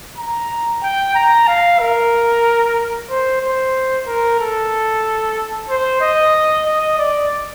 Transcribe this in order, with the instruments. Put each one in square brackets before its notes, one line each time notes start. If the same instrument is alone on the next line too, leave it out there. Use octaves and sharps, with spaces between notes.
[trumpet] A#5
G5
A#5
F5
A#4
C5
C5
A#4
A4
C5
D#5
D#5
D5